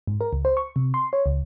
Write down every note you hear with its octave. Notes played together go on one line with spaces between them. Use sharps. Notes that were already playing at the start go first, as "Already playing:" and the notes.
G#2
A#4
C#2
C5
C#6
C3
C6
C#5
C#2